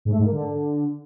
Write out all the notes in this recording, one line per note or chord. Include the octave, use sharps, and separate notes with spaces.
G#2
A3
G#2
A#3
D3